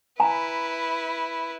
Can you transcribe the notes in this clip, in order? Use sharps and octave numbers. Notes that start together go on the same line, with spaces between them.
E4 B4 G#5 A#5